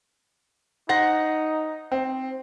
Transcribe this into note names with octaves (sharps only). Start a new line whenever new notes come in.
D#4 C5 F#5 A#6
C4